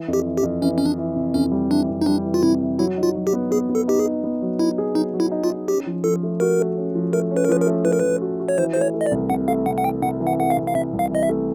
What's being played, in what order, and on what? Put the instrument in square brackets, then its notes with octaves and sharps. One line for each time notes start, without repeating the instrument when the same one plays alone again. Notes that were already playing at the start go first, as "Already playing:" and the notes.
Already playing: [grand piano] E3
F2
[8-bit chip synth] G4
[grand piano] E3
[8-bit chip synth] G4
[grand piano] F2
[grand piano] E3 [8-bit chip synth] C#4
[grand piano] E3 [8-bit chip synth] C#4
[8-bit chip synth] D4
[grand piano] E3
C3
[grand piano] F2 [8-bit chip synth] C#4
[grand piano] G3
[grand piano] E3 [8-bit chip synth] D4
[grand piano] F2
[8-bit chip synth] D#4
[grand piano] G3 [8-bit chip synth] D4
[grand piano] E3
[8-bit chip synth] F4
[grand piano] C3 [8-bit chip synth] E4
[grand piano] E3
[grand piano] F#3 [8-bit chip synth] E4
[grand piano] D#4
[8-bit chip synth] F4
[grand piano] F#3
[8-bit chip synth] G4
[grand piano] B3
[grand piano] B3 [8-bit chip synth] G#4
[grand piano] B3
[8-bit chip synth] A4
[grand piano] D#4 [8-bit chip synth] G4
[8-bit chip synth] G#4
[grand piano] D#4
B3
F#3
[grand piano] D#4 [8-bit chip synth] E4
[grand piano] G#4
[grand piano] F#3 [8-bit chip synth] D#4
[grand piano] F#3
[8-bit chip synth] E4
[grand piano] D#4
[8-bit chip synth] F4
[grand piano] D#4
[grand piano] C#4 [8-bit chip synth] G4
[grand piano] F3
[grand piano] F3 [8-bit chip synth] A4
[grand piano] A3
[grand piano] F#4 [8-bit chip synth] A#4
[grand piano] A3
C#4
F3
[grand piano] A3 [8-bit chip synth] A#4
[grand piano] C#4
[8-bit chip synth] B4
A#4
[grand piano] F3 [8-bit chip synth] B4
[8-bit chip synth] A#4
[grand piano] A3
[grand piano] F3 [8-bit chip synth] B4
[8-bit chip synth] A#4
[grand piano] F3 [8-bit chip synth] B4
[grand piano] F#4
F#4
[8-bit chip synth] C#5
[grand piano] E3 [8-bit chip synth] C5
[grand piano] A3 [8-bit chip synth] C5
[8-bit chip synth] C#5
[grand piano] A3
[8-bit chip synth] D#5
D5
[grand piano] C2
[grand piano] C3 [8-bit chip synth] F#5
[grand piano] A3 [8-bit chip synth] F5
[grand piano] C3 [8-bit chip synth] F#5
[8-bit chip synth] F#5
[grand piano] E3 [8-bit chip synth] G5
[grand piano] C3 [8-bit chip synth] F#5
[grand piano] E3
[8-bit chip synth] F#5
[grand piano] A3 [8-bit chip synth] F#5
[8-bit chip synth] F5
[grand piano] C3
[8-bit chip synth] F5
[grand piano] C3 [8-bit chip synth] E5
[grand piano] C2
[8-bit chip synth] F5
[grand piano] E3 [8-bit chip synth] D#5
[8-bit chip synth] E5
[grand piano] A3